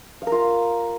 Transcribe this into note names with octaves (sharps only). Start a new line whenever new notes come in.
F5
A#4
F4